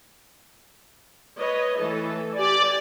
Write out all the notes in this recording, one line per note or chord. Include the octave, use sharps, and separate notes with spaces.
B4 C#5 D#5
E3 A3 A4
G4 D5 G#5